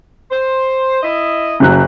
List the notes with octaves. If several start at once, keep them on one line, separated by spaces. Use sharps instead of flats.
C5
E4 D#5
F#1 F#3 F#6